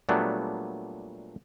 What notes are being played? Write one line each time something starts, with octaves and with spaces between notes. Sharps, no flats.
A#2 F#3 G3 A3 B3 D4